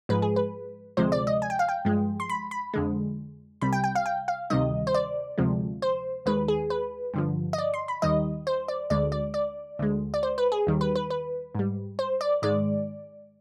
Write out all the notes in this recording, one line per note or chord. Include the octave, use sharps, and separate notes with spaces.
G#2 F3 G#3 B4
G#4
B4
D2 C3 F3 G#3 C5
D5
D#5
G#5
G5
F5
G5
G2 F3 G#3
C6
B5
B5
F2 D3 G#3
C2 C3 G3 B5
G5
G5
F5
G5
F5
D2 C3 D#3 G3 D#5
C5
D5
D2 C3 F3 G#3
C5
D#2 D#3 G#3 B4
G#4
B4
G2 D3 F3
D#5
D5
C6
B5
D#2 D#3 G3 D#5
C5
D5
D2 D3 G#3 D5
D5
D5
D2 D3 G#3
D5
C5
B4
G#4
D#2 D#3 G3
B4
B4
B4
G#2 G3
C5
D5
G#2 D#3 G#3 D5